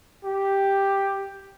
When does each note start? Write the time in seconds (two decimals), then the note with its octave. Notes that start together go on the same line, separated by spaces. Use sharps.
0.25 G4